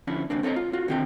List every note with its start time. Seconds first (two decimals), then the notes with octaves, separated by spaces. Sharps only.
0.07 D3 F3 C#4 D4 E4
0.30 D#2 G#2 C#3 A#3 C4 D4
0.43 C4 A4 C#5 D#5 A#5
0.56 F4
0.73 F4 F#4
0.88 D3 D#3 C4 G4 G5